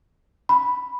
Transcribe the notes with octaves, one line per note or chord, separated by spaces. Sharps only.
B5